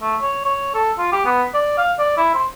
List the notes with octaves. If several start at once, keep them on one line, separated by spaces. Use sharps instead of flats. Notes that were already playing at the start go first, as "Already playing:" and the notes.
A3
C#5
C#5
A4
F4
G4
B3
D5
F5
D5
E4
C5